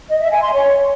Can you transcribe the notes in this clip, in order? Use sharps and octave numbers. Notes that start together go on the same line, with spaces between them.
D#5
E5
G#5
C6
C#5